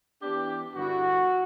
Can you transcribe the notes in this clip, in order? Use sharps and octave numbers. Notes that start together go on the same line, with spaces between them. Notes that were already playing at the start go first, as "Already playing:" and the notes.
E3 B3 D4 G4
G2 D3 G3 B3 E4 F#4